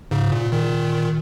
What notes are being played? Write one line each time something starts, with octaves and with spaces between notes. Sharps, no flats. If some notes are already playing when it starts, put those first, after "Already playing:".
G#2 C#3
A#2
A#2 D#3